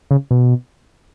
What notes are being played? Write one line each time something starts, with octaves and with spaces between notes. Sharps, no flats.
C#3
B2